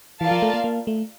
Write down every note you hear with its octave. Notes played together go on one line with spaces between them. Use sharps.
E3 F4 A#4 D5 F5 A5
F3
A3
A#3
A#3
A3